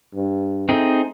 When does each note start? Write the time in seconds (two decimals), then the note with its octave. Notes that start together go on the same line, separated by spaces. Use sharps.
0.14 G2
0.69 A3 C4 D#4 G#4